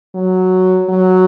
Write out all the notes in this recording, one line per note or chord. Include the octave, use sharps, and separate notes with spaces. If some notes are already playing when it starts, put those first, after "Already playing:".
F#3
F#3